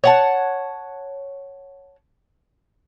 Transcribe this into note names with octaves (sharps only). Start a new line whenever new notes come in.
C#5 F#5 A5